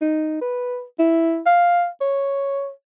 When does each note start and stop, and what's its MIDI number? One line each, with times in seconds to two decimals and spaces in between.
0.01 0.38 63
0.41 0.83 71
0.99 1.41 64
1.46 1.87 77
2.01 2.70 73